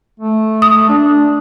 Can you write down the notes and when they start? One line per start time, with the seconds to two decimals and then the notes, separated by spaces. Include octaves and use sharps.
0.20 A3
0.62 D#6
0.89 D4